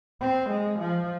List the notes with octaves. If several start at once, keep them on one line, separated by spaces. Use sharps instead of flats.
C4
G#3
F3